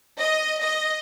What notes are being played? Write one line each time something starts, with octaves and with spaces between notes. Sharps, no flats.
D#5
D#5